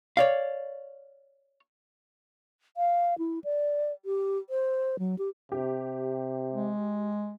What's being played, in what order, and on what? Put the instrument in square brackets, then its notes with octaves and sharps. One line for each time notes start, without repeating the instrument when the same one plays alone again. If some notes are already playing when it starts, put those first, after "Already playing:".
[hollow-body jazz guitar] C#5 D5 F5
[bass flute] F5
E4
D5
G4
C5
F#3
G4
[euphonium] C3 [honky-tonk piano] G4
[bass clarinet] G#3